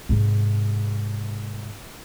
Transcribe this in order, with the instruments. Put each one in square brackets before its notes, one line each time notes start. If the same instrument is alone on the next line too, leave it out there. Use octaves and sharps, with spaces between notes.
[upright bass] G#2 C3